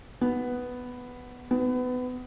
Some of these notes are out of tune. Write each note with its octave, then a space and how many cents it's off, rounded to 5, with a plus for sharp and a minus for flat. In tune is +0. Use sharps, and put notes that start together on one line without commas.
B3 +5
B3 +25